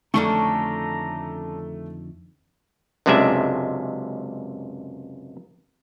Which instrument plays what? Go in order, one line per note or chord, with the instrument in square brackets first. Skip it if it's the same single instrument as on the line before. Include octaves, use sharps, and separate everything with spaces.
[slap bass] F2 D3 D#3 [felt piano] A3 [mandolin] C#4 D4 C#6 [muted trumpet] A#5
[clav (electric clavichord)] C#2 F#2 C3 G#3 D4 E5